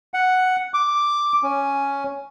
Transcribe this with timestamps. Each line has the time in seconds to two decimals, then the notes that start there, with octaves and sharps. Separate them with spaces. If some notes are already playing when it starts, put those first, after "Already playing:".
0.14 F#5
0.74 D6
1.43 C#4